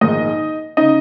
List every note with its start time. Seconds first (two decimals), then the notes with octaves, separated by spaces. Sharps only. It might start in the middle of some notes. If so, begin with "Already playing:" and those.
0.01 A#1 G#2 D#3 G#3 D#4 D#5
0.77 C#3 D#4 D#5